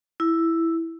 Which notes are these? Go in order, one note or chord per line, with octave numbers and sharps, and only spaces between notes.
E4